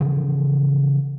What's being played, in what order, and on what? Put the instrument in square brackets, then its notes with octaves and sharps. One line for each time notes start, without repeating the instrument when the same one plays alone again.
[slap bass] C#3 E3 F3